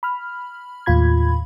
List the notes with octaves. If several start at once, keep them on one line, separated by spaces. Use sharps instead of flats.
B5 F6
D#2 A2 F4 B5 G#6